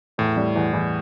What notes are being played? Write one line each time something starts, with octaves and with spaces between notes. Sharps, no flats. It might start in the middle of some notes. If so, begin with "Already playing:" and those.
E2 A2
G3
E2
E2